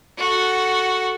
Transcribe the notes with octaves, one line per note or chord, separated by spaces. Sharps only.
F#4 A4